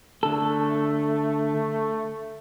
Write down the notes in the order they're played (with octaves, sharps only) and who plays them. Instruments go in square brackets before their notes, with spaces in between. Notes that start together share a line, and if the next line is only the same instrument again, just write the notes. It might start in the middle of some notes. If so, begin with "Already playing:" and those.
[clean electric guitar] D3 A4 [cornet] A3